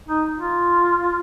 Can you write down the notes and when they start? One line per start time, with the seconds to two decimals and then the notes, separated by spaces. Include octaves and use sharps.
0.08 D#4
0.40 F4